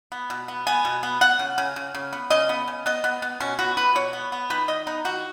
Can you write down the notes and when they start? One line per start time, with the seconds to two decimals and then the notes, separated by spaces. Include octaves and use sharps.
0.12 B3
0.30 B2
0.48 B3
0.67 B3 G#5
0.85 B2
1.03 B3
1.21 B3 F#5
1.39 C#3
1.58 C#3
1.76 C#3
1.95 C#3
2.13 B3
2.30 C#3 D#5
2.49 B3
2.68 C#3
2.86 B3 D#5
3.04 B3
3.22 B3
3.40 B2 C#4
3.59 B3 F#4
3.77 B3 B4
3.95 B2 C#5
4.13 B3
4.32 B3
4.50 D#3 B4
4.68 D#3 D#5
4.87 B3 D#4
5.05 D#3 F#4